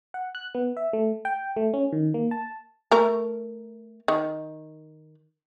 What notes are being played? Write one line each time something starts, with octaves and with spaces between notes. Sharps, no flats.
F#5
F#6
B3
E5
A3
G5
A3
C#4
D#3
A#3
A5
A3 A#4
D#3